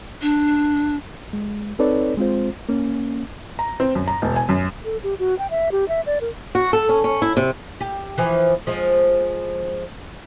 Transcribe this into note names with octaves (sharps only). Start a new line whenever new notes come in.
D4
G#3
C4 D#4 A4 B4 C#5 D5
G#3 C4 F4 C5
A#3 C#4
A#5
C4
F#2
A#5
E1
G#5
F#2
A4
G4
F#4
G5
E5
G4
E5
D5
A#4
F#4
A4
C#4
C#4
E4
C3
G4
E3 F3
F3 G#3